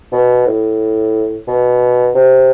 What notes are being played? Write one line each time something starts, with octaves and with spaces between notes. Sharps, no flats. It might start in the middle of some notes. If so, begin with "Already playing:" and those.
B2
A2
B2
C3